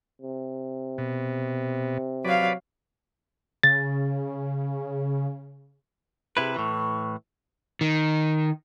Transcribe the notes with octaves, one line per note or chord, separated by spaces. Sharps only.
C3
B2
F#3 B4 D5 F5
C#3 A6
C3 E4 G#4 B4
A2 E3 C#6
D#3